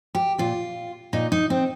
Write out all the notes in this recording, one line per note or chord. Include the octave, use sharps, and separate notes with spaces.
G4
A#2 F4
A#2 D#4
D#4
C4